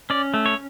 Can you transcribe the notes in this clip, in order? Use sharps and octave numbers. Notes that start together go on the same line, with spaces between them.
C#4 D5
A3
C#5